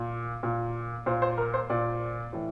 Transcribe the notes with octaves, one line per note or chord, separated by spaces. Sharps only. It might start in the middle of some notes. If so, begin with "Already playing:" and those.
Already playing: A#2
A#2
A#2 C5
C5
A#4
C5
A#2 D5
A2 E3